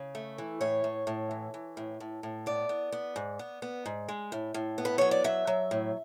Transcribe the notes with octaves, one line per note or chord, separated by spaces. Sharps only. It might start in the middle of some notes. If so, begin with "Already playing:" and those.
Already playing: C#3
A3
E3
A2 C#5
A2
A2
E3
E3
A2
A2
A2
B3 D5
B3
B3
G#2
B3
B3
G#2
G#3
A2
A2
B3
B4
F#3 C#5
D5
F#3 E5
F#3
A2